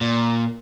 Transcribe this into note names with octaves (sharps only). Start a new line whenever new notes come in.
A#2